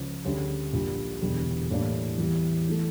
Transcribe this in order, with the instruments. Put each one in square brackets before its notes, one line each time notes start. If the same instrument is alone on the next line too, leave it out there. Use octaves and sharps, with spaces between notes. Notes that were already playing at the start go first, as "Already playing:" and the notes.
Already playing: [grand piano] C#2 C#3 F3 C#4
D2 C#3 G3 C#4
A#1 A#2 G3
E1 E2 D3 G3
A2 E3 G3 A#3 D4
E2 E3 G3
E3 A3